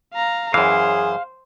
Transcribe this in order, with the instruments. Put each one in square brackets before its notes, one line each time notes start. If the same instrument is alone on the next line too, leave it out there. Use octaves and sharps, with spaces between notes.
[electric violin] F5 A#5
[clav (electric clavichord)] F#2 E3 [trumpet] G#4 [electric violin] C5 [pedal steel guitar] F5